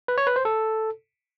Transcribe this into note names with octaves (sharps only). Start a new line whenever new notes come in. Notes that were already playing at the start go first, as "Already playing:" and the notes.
B4
C#5
B4
C5
A4